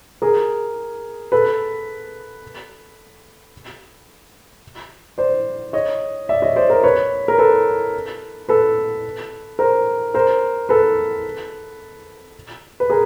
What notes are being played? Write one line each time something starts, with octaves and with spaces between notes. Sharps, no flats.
G#4 A#4
A4 B4
C5 D5
C#5 D#5
D5 E5
C#5 D#5
C5 D5
A#4 C5
B4 C#5
A#4
A4 B4
A4 B4
A#4 C5
A#4 C5
A4 B4
B4
G#4 A#4